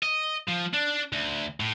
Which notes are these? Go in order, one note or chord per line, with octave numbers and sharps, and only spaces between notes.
D#5
F3
D4
D2
A2